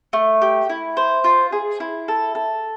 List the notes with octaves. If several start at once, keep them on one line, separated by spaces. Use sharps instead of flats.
A3
G4
E4
C5
F4
G#4
E4
A4
A4